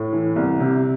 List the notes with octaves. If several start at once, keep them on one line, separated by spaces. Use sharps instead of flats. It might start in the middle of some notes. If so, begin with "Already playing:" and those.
Already playing: A2
E3
C2
C3